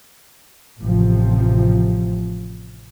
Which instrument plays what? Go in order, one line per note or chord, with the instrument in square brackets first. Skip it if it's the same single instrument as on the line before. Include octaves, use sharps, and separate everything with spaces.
[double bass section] A1 C3 F3